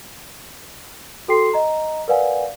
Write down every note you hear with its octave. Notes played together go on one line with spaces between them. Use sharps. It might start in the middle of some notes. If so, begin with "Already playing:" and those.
F#4 A4 G5 C6 C7
D#5 A#5
A#4 B4 D5 F5 F#5 G#5